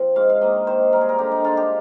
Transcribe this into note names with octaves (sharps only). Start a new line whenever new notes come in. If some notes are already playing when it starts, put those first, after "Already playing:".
Already playing: F3 C4
G#2 F5
F5
D#3 A#3 D#5
D#3 C5
G3 C4 A#4
G#4
A#4
D3 G4
D#4
G#3 D4 F4
G4